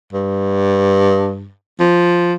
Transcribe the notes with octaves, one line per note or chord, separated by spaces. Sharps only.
G2
F3